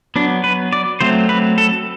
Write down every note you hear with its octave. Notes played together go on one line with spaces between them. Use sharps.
F#3 B3 D4
B4
D5
F#3 A3 C4 C5
B4
A4